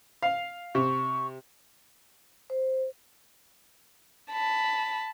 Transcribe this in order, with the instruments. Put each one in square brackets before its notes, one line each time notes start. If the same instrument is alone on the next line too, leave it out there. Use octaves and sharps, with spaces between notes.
[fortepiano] F5
[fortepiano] C3 [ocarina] C#6
[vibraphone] C5
[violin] A5 B5